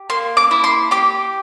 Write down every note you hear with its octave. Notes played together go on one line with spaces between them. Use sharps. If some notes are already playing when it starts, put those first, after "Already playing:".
Already playing: G4
A#3 C6
D6
E4
C6
G4 D6